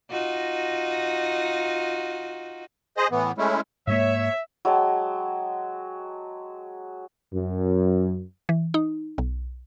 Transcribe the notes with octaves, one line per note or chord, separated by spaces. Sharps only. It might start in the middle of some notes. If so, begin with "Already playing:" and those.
D#4 F4 F#4
G#4 C5 D#5
A2 E3 B3
G#3 A3 C#4 E4
G#2 G#3 A#3 C#5 E5
F#3 G#3 G5 A5
F#2
E3
D#4
B1